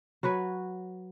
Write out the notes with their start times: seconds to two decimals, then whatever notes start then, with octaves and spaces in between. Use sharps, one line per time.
0.23 F#3 F#4 B4 C#5